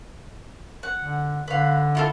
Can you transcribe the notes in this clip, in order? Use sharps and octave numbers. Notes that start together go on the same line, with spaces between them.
F#5
D3
D3 B4 F5
E4 F4 A4